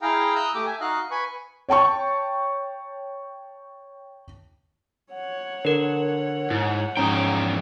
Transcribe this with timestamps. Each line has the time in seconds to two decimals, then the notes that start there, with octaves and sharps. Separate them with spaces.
0.02 E4 G#4 F5 G5 A#5
0.35 A#5 D#6 E6 F#6 G6
0.55 A3 G4 D6
0.66 E5 G#5
0.81 D#4 F#4 D#5 F5 F#6
1.11 B4 G#5 B5 C#6
1.69 C#5 G5 A5 C#6
5.13 C#5 F#5
5.65 D3 A#4 B4
6.50 G#2 E4
6.97 E2 G#2 F3 C#4 G5 A#5 D#6